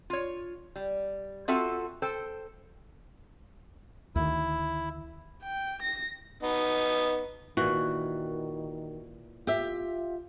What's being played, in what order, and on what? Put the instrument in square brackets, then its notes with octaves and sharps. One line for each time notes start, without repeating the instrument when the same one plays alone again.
[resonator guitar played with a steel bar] F4 C#5
G3
C4 F4 F#4 A4 E5
A4 C5 G5
[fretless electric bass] D2 D#3 [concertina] E4
[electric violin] G5
A#6
[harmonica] B3 D#4
[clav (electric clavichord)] A#2 E3 [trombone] D#3 [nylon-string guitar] F#4
[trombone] F4 [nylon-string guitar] G4 E5